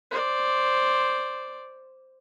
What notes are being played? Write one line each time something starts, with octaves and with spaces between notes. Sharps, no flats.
C5 D5